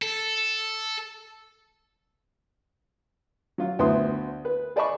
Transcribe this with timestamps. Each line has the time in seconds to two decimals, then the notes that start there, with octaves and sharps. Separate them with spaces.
0.02 A4
3.58 F#3 F4
3.79 D2 B3 E4 C6 D#6
4.45 B4
4.76 G#4 D5 D#5 A5 B5 C#6